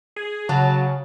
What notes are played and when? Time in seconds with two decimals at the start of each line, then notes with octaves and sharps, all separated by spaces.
0.16 G#4
0.49 C#3 F#3 A5